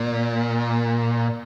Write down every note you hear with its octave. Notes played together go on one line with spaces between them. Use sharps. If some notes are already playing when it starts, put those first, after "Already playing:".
Already playing: A#2